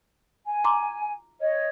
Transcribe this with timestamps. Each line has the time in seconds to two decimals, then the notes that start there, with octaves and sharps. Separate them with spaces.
0.46 G#5
0.64 A#5 C6 D6
1.40 C#5 D#5